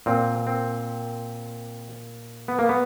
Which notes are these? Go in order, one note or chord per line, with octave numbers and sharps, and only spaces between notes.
A#2 C4
C4
B3
A#3
B3